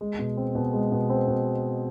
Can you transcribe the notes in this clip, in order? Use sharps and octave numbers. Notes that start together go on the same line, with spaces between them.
G#3
B2
C4
B2
G#3
B2
C4
B2